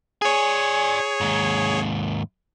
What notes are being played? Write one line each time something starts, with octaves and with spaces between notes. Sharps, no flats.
G#4 C#5 D5 G#5
D#2 G#2